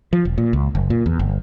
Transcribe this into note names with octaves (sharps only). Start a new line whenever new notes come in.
F3
E1
A#2
C#2
F#1
A#2
E2
G1